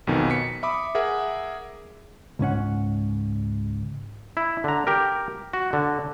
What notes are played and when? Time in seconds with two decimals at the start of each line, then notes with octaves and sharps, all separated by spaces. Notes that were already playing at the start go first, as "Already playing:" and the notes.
0.07 B1 F2 D#3 B3
0.30 B6 C#7
0.63 E5 B5 D6 D#6
0.95 G#4 A#4 E5 F#5
2.39 C#2 G#2 C#4 F#5
4.37 E4
4.64 D3 A#5
4.87 G4 A#4
5.53 F#4
5.73 D3